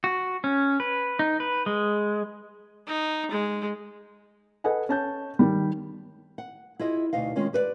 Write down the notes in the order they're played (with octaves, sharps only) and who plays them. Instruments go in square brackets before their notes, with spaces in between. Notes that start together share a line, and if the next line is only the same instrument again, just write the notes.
[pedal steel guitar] F#4
C#4
B4
D#4
B4
G#3
[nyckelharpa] D#4
G#3
[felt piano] A4 B4 D#5 F#5 G#5
C#4 A5 G6
D#3 G3
[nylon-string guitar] F#5
E4 F4 G#4 D#5
D2 B2 D#4 D#5 F5
D#3 G#3 C#4 F4
G4 B4 C#5 D5